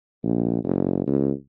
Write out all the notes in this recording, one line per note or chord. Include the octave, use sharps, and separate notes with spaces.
A#1
F#1
C#2